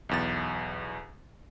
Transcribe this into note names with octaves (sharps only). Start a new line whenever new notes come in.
B1 E2 A6